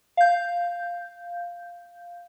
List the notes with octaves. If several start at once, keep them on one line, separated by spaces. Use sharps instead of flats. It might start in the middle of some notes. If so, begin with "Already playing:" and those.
F5 G6